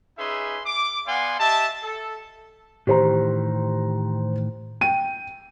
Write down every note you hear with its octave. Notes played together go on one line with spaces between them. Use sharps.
C#4 D#4 G#4 B4 E5 C6
D6
B3 D5 F5 F#5 G#5 C6
G4 D#5 E5 A5
A4
A2 D#3 E3 G4 C5 A#5
G5 D#7